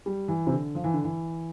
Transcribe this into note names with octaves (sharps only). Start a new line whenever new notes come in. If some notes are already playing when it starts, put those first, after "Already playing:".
G3
E3
C3
D3
F3
E3
D3
E3